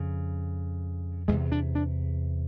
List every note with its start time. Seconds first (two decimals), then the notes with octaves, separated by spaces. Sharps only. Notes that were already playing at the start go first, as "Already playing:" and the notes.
Already playing: F2 C#3
1.28 E2 C3 G#3
1.52 D4
1.75 D4